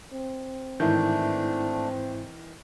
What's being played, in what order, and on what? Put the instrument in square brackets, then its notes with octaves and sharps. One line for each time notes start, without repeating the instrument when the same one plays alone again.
[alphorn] C4
[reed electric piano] G#2 E4 G6 [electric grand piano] D#3 E3 [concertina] A3 D4